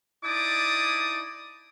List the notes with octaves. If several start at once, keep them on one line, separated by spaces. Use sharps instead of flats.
D#4 E4 D5 A5 D6 D#6